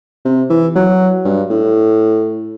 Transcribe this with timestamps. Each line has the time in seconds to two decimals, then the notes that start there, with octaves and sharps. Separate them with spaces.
0.25 C3
0.50 E3
0.76 F#3
1.25 G2
1.50 A2